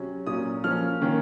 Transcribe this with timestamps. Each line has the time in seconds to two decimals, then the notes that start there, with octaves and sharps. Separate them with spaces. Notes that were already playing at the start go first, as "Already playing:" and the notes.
Already playing: C3 F#3 C#4
0.27 A#2 F#3 C#4 D#6
0.64 F3 A#3 C#4 F6
1.01 D#3 A#3 C#4